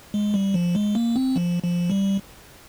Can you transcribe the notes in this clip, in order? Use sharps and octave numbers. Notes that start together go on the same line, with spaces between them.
G#3
G3
F3
G#3
A#3
C4
F3
F3
G3